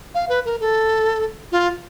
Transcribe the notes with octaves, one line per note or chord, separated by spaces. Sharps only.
F5
B4
A#4
A4
F4